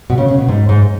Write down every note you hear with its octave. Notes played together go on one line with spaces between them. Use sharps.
B2
C#3
C#3
B2
G#2
G#2